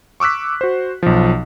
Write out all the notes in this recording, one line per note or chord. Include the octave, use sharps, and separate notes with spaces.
C#6 D6 E6 F#6 B6
F#4 C5
B1 F3